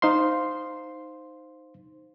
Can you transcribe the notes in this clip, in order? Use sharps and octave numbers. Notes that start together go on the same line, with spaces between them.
D#4 C5 F5 C6